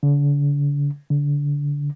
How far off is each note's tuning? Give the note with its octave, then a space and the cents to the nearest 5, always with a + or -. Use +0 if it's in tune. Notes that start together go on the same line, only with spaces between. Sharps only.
D3 -40
D3 -25